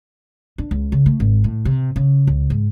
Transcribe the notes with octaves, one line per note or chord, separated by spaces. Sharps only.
D4
C#2
C#3
A3
G#1
A2
C3
C#3
C#2
G#2